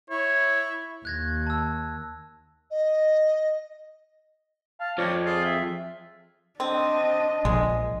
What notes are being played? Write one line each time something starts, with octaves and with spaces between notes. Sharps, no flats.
E4 C#5
D#2 F#6 G#6 A#6
A5 E6
D#5
F5 A5
F2 F3 C#5 D5
F4 G#4
E5
C4 D4 D#5
A#1 G#3